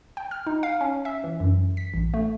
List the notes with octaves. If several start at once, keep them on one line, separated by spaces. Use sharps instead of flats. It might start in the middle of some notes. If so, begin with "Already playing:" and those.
G5
F6
D#4
F5
C#4
E5
E3
F#2
B6
A1
A3